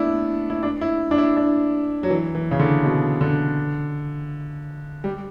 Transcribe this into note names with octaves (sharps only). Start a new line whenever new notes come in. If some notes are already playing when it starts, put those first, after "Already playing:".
Already playing: A3 B3 D4 E4
E4
D4
E4
D4
E4
D4
F#3
E3
E3
C#3
D3
B2
D3
G3